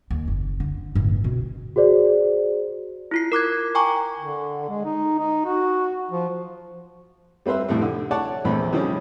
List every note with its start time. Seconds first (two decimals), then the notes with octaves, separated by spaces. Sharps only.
0.10 D#2
0.28 F#1
0.60 D3
0.95 G1 A2
1.24 B2 C4
1.76 F#4 G#4 C5 D5
3.11 E4 F4 C7
3.32 A#4 D6 F#6 G#6
3.75 G5 G#5 A#5 C#6 D6
4.19 D3
4.69 G#3
4.85 D#4
5.18 D#4
5.45 F#4
6.11 F3
7.46 G3 C4 B4 C5 E5
7.69 F2 A2 C3 A3
7.82 D3
8.11 C#5 D5 F#5 A5
8.45 A#1 E2 A3 C4 B5
8.72 C3 D#3 F3 G3 C#4 D4